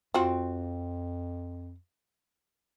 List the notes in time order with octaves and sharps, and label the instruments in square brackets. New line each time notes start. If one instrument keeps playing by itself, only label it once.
[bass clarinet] F2 [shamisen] C4 F4 F#4